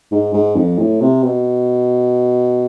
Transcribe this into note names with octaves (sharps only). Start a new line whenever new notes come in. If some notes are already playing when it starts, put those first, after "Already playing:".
G#2
G#2
F2
A2
C3
B2